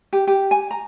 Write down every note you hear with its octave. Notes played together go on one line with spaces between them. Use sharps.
G4
G4
G#5
A#5